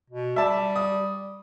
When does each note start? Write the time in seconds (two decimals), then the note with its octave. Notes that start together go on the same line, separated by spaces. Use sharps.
0.10 B2
0.36 G3 E5 A5
0.76 D#6